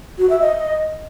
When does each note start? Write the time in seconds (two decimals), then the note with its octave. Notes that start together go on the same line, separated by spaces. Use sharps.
0.18 F#4
0.30 E5
0.41 D#5